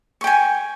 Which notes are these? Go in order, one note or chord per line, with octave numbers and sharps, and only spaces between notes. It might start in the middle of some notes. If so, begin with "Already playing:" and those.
G5 G#5 C#6